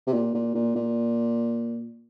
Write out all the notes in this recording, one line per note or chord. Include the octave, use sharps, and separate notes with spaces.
C3
A#2
A#2
A#2
A#2